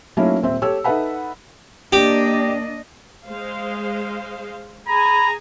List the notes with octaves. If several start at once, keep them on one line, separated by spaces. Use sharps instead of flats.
F#3 A3 A#3 C#4 D#4 E4
D#1 C4 E5
G4 A4 C#5 E6
D#4 A4 B4 E5 F#5 B5
A#3 D4 G4 D#5
G#3 C5 F5
G#4 G#5 A#5 B5